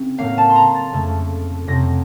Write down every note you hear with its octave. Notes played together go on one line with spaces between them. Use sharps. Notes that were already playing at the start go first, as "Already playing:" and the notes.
Already playing: C#3 C4 D#4
A2 F#3 A#3 F5
A5
C6
A#5
A6
F2 C#3 A3
F2 C3 F#3 C4 A#6